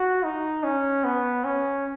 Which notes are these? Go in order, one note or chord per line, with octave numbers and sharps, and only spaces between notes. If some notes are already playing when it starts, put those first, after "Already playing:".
Already playing: F#4
D#4
C#4
B3
C#4